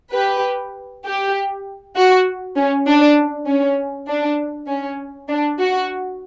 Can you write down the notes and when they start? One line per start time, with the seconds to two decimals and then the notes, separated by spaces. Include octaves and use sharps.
0.14 G4 B4
1.05 G4
1.95 F#4
2.56 C#4
2.86 D4
3.46 C#4
4.08 D4
4.68 C#4
5.28 D4
5.59 F#4